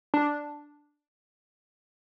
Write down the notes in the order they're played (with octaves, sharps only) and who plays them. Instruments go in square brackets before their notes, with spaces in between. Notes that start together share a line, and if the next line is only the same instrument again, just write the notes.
[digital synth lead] D4